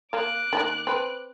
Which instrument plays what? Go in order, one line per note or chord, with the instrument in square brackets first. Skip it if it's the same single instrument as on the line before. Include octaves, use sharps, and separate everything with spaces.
[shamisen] A#3 F5 [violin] D6 F#6
[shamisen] D#3 G3 A#3
C4 B4